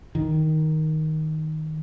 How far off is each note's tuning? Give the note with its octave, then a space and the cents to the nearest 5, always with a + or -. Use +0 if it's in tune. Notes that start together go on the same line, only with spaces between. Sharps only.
D#3 +5